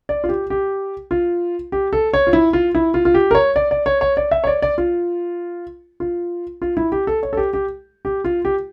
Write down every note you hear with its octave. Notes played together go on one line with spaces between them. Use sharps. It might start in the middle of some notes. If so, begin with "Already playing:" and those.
D5
F4
G4
G4
F4
G4
A4
C#5
F4
E4
F4
E4
F4
F4
G4
A#4
C#5
D5
D5
C#5
C#5
D5
E5
C#5
D5
D5
F4
F4
F4
E4
G4
A4
C#5
A4
G4
G4
G4
F4
G4